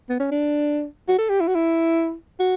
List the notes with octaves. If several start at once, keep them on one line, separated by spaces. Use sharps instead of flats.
B3
C#4
D4
F#4
A4
G4
E4
F#4
E4
F#4